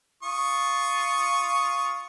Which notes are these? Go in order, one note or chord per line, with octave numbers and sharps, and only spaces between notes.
F4 C#6 D#6